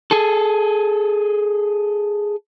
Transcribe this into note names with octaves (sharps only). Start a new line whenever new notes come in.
G#4 A4